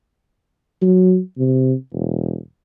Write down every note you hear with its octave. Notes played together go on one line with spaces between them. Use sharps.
F#3
C3
E1